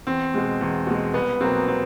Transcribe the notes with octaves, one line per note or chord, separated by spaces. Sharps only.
E2 C4
B2 G#3
E2
B2 G#3
C2 B3
B2 F#3 A#3 C4
C4